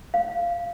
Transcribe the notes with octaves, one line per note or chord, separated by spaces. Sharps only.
F5